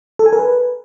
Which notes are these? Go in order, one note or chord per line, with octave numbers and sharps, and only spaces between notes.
A4
G#5
A#4
B4